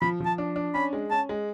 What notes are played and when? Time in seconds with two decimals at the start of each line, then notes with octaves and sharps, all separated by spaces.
0.02 F3 B5
0.20 F3
0.26 A5
0.38 D4
0.56 D4
0.74 C#4 B5
0.93 G#3
1.10 C#4 A5
1.29 G#3